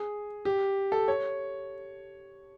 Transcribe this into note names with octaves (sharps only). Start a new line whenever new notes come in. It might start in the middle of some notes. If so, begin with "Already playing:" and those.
Already playing: G#4
G4
A4
C#5